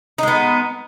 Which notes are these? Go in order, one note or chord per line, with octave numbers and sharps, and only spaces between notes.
G#3 B3 D#4